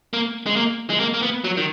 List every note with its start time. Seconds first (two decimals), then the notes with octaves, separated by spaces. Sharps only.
0.13 A#3
0.46 G#3
0.56 A#3
0.90 G#3
1.00 A#3
1.14 A#3
1.22 B3
1.44 F#3
1.57 D#3